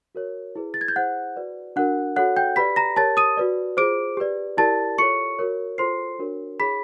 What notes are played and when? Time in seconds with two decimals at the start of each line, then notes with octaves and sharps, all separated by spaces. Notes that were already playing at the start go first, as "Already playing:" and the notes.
0.15 F#4 A#4 C#5
0.55 E4 G#4 B4
0.74 A6
0.81 G#6
0.88 G6
0.96 E4 G#4 C5 F#5 F#6
1.36 F#4 B4 D5
1.76 D4 F#4 A#4 F#5 F#6
2.16 F#4 A4 C#5 F#5 F#6
2.36 G5 G6
2.56 G4 B4 D5 B5 B6
2.76 A#5 A#6
2.96 G4 A#4 C#5 A5 A6
3.17 D#6 D#7
3.37 F#4 B4 D5
3.77 F4 G#4 C5 D6 D7
4.17 G4 B4 D5
4.57 E4 G4 A#4 D5 A5 A6
4.98 F4 A4 C#5 C#6 C#7
5.39 F#4 A#4 C#5
5.78 F4 A4 C5 C6 C7
6.19 D4 F#4 A#4 C#5
6.59 E4 G#4 C#5 B5 B6